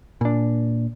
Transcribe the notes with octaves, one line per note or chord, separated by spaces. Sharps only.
A#2 D4